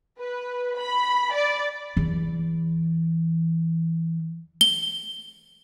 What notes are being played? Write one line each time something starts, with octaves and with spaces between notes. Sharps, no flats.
B4
B5
D5
E2 E3
G7